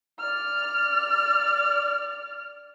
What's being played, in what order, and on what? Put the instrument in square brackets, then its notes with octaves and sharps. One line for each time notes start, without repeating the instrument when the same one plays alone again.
[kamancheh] D5 F6